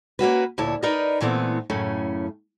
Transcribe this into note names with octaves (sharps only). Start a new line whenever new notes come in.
A#3 C#4 F#4 B4
D2 A#2 E4 C#5 A5
D#4 A#4 B4 D5 D#5
A#2 E3 A3 B3 C4
F#2 A2 C#3 A3 C#4